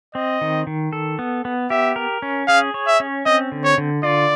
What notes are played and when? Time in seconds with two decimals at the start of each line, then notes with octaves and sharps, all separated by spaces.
0.15 C4 D#5
0.41 D#3
0.67 D#3
0.93 A4
1.19 B3
1.45 B3
1.70 G4 E5
1.96 A#4
2.22 C#4
2.48 G#4 F5
2.74 C#5
2.87 E5
3.00 C#4
3.26 C4 D#5
3.52 D3
3.64 C#5
3.78 D3
4.03 F4 D5